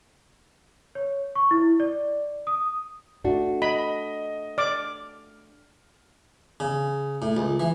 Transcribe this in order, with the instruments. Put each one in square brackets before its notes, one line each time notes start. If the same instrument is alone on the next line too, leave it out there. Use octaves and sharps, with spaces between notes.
[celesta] C#5
C#6
E4
D5
D#6
[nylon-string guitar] A3 D4 F#4
[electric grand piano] D#5 [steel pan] B5
[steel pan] D5 D6 [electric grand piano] F6
[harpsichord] C#3
A2
C#2
E3